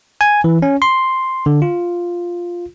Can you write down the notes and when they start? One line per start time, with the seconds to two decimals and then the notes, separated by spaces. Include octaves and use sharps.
0.21 G#5
0.44 E3
0.62 C#4
0.82 C6
1.46 D3
1.62 F4